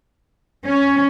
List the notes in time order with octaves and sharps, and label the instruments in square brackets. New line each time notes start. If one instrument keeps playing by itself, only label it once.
[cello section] C#4